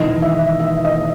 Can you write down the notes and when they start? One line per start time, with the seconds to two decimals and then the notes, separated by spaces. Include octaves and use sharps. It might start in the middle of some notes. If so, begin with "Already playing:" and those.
Already playing: E1 E2 D#3 D#5
0.22 E5
0.60 E5
0.85 D#5